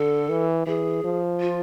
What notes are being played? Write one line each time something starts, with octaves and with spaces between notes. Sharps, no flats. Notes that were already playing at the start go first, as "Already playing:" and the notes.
Already playing: D3 A4
E3
E3 G#4
F3
F4